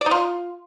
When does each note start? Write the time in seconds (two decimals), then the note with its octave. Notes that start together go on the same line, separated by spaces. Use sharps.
0.01 D5
0.06 D#4
0.11 F4